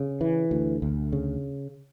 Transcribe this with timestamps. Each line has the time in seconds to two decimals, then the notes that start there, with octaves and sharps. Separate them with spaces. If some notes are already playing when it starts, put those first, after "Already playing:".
Already playing: C#3
0.21 E3
0.51 D2
0.82 D2
1.13 C#3